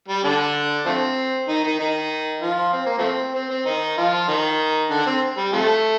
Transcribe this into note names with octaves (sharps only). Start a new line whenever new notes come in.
G3
D3 D4
F3 A3 C4
D#3 D#4
D#3 D#4
D#3 D#4
F3 F4
C4
A#3
F3 A3 C4
C4
C4
D#3 D#4
F3 F4
D#3 D#4
D3 D4
C4
G3
C3 F3 A3